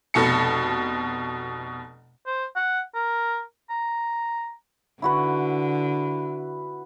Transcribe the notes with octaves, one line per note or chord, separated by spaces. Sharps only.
F1 B2 A4 C#7
C5
F#5
A#4
A#5
D3 E4 F#4 B4